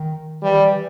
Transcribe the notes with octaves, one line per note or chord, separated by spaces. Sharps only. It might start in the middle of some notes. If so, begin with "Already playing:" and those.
Already playing: D#3
E3 G3
D#3
E3